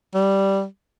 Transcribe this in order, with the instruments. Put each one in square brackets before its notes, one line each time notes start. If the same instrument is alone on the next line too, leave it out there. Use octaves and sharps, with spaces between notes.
[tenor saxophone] G3